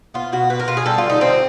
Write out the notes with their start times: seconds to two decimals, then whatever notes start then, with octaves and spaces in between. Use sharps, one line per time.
0.14 B3 F4
0.32 B2 F#4
0.50 B2 B4
0.60 A#4
0.68 B2 F4
0.77 G#4
0.86 G3 A4
0.98 F4
1.04 D3
1.10 D#4
1.21 G3 C4